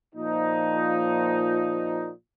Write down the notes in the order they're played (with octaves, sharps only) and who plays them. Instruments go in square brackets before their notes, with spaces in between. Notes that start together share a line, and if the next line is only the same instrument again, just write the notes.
[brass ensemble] A#2 F3 D#4